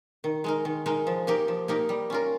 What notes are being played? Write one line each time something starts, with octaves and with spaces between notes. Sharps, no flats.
D#3
G#3 D#4 A#4
D#3
G#3 D#4 A#4
F3
A#3 D#4 G4 A#4
F3
A#3 D#4 G4 A#4
G3
C#4 F4 A#4